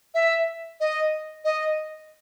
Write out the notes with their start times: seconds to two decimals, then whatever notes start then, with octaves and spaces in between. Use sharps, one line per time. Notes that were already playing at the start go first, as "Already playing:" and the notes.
0.14 E5
0.80 D#5
1.45 D#5